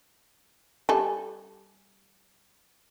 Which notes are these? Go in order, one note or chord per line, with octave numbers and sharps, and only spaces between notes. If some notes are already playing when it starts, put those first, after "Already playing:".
G3 A4 G#5